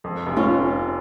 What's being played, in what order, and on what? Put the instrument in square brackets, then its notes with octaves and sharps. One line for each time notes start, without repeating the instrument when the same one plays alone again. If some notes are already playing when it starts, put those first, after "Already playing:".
[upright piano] F2
F1
[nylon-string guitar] C#4 F4